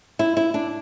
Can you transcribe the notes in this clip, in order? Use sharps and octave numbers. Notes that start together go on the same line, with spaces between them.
E4
E4
D4